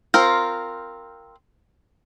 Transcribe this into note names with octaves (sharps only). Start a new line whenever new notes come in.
C4 F4 A#4